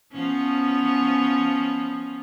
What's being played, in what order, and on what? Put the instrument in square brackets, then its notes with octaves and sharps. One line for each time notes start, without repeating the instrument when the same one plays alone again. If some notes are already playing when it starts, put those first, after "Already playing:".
[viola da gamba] F3 B3 C#4